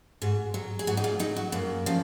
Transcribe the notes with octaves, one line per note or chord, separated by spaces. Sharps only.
G#2 F#4
F#3
G#4
G#2 F#4
D#4
F4
F#3 D#4
F#4
F#2 A#3
C#3 F3